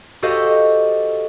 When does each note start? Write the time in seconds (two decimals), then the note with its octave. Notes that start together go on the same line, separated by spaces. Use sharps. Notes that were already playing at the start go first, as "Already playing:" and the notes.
0.22 F#4 G4 A4 C5 D#5 F5